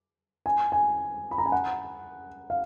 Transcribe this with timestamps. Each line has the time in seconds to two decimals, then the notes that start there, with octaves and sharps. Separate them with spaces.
0.46 G#5
0.72 G#5
1.31 B5
1.38 A#5
1.46 G#5
1.52 F#5
2.50 F5